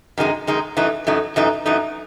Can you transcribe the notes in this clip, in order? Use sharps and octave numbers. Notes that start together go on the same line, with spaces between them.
F#2 D#3 G#3 D#4
F#2 D#3 G#3 D#4
F#2 E3 A3 D#4
F#2 E3 A3 D#4
F#2 E3 A3 D#4
F#2 E3 A3 D#4